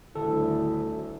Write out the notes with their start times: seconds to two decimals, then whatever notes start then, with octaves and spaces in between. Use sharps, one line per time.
0.15 D#1 D2 E4 A4